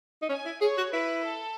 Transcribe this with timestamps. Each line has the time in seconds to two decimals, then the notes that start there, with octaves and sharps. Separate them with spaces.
0.22 D#4
0.29 C#4 G#5
0.45 E4
0.61 G#4 C#5
0.78 F#4
0.93 E4 B4
1.25 A4